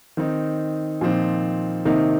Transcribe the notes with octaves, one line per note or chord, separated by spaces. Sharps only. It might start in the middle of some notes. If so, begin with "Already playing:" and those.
D#3 C4 D#4
A#2 F3 C4 D#4
C3 D#3 A#3 D#4